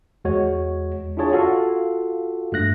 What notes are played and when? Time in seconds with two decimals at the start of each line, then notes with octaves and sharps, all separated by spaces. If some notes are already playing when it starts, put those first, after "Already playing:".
0.25 E2 G#3 F#4 C#5
1.17 D4 E4 F4 G#4 C#5 A5
1.31 F4 F#4 A4 F5
2.52 G2 A3 F#6 A#6